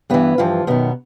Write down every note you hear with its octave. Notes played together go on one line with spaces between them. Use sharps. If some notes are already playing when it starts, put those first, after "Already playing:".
G2 E3 B3 B4
G2 E3 F3 F4
F#2 B2 D#3 B3